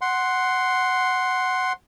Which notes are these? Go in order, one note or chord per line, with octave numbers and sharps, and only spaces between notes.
F#5 C6